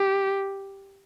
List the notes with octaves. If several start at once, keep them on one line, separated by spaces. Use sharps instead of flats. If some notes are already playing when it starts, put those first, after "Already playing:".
Already playing: G4